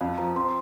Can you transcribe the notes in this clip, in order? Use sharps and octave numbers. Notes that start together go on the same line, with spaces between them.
F2 F5
F3 A#5
C4 C6